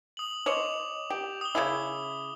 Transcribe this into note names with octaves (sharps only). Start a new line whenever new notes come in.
D#6 F#7
C5 C#5 D#5 D6 F7
G4
D#6 G7
C#3 C#4 E4